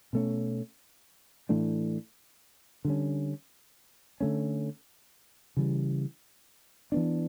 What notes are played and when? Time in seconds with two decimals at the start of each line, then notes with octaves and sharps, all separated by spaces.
0.13 B2 A3 C#4
1.49 A2 E3 A3 D4
2.85 D3 G3 C#4
4.20 D3 A3 C#4
5.57 C#3 E3 G3
6.92 E3 B3 D4